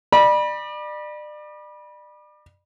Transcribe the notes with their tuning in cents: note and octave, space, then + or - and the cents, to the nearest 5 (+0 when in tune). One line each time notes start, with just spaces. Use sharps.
D5 +35 B5 -25